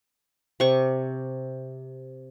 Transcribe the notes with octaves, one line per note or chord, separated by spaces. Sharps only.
C3 C#6